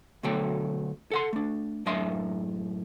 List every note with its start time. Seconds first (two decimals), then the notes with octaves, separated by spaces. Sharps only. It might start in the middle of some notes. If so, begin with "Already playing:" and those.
0.23 D2 B2 F#3 A3 G5
1.11 A4 F#5 C6
1.33 A3 D4
1.86 F#2 A2 D4 D#5 E5 C6